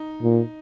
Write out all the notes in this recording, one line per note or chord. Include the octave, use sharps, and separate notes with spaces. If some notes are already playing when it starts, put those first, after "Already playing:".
Already playing: D#4
A#2